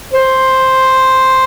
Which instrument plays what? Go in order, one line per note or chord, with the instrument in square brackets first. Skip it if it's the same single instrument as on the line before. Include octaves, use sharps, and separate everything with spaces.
[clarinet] C5